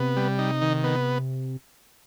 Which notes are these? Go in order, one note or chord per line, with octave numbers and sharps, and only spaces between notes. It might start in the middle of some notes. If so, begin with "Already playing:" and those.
Already playing: C3 B3
G3
D#4
D#3
B3